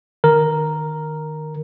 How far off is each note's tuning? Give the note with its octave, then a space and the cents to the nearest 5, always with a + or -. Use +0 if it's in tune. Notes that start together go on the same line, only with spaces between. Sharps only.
D#3 -20 A#4 +0